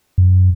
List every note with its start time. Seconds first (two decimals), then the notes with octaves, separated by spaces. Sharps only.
0.18 F#2